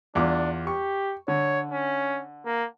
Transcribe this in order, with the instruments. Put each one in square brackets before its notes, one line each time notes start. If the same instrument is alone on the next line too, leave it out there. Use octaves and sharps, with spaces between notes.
[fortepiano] E2 F4 D6 [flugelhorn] D4
[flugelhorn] G4 [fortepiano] C#6
[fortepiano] D3 [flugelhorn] C#5
[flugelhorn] C#4
A#3